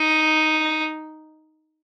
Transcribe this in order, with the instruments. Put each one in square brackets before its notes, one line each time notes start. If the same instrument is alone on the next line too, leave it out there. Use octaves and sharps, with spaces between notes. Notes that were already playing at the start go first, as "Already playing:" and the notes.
Already playing: [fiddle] D#4